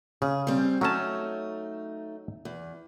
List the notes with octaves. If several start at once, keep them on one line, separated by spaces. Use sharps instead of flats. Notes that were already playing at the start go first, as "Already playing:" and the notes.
C#3 G#4
G3 C4
F#3 A3 C#4 D#4 A5
E2